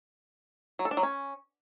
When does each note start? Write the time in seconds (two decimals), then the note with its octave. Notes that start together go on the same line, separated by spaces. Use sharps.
0.79 F#3
0.85 A4
0.91 D4
0.97 F#3
1.03 C#4